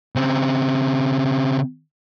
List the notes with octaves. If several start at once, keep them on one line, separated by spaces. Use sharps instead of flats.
C#3 C4